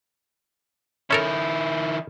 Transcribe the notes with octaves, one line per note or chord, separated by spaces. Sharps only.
D#3 C#4 E4 A4 A#4